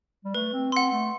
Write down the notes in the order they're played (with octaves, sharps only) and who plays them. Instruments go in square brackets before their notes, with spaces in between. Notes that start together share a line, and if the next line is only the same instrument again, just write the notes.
[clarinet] G3
[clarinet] A3 [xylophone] B4
[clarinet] C4
[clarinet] C4 [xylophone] F#5 C6
[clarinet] A3